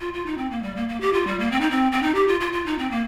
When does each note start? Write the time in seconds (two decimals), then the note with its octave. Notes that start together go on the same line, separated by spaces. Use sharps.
0.01 F4
0.14 F4
0.26 D#4
0.38 C4
0.51 A#3
0.63 G3
0.76 A#3
0.89 A#3
1.01 G4
1.14 F4
1.27 G3
1.39 A#3
1.52 C4
1.61 D#4
1.71 C4
1.92 C4
2.03 D#4
2.15 G4
2.28 F4
2.41 F4
2.53 F4
2.66 D#4
2.79 C4
2.91 A#3